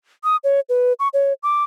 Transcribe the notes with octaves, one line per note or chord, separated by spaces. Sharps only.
D#6
C#5
B4
C#6
C#5
D6